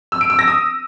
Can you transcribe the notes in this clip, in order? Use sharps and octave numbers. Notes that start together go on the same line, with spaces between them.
E6
D7
E6
A#6
D#6